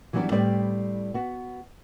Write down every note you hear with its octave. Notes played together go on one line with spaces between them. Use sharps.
E3 F#3 G3 A#3 B3 D4
A2 G3 C4 G4 B4 D5
B3 F#4